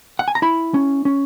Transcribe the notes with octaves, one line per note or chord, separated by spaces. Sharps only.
F#5
G#5
A#5
E4 B5
C#4
C#4